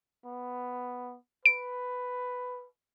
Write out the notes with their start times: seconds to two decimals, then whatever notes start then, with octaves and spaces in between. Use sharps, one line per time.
0.25 B3
1.46 B4 D7